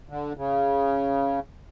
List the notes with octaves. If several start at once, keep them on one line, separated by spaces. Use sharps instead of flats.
D3
C#3